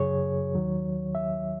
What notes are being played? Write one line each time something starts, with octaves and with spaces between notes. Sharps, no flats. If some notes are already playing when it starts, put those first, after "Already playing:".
Already playing: F#2 C#3 F#3 G#4 C#5
D#2 D#3 F#3
E5